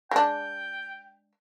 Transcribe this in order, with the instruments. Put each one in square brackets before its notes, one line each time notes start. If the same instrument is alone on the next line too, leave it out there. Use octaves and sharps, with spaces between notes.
[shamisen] G#3 D4 [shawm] G5